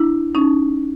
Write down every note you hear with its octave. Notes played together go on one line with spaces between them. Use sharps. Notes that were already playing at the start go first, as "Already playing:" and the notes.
Already playing: D4 E4
C#4 D#4